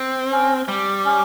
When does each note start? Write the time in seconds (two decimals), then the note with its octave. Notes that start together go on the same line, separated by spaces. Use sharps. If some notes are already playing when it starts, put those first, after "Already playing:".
Already playing: C4
0.31 C#4
0.68 G3
1.05 C#4